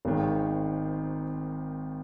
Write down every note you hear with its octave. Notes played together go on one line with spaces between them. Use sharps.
G#1 G#2 D#3